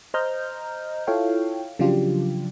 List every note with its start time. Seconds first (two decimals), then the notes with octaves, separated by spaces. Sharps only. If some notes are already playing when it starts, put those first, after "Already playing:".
0.14 C5 D#5 A#5 F6 G6
1.07 E4 F4 A4 C#5 F5 G5
1.79 C#3 F3 F#3 D4 F4 G4